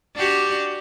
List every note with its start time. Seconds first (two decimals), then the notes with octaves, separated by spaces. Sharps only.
0.16 D4 F#4 G4